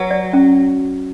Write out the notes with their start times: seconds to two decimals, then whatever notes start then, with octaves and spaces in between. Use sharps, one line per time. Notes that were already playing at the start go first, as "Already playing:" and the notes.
Already playing: F#3 B4
0.11 D5
0.33 C#4